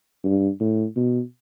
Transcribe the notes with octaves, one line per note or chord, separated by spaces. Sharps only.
G2
A2
B2